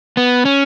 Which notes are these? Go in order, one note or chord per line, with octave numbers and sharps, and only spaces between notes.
B3
C#4